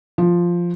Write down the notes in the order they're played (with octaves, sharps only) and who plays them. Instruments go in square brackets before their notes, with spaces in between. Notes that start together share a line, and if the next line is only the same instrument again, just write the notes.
[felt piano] F3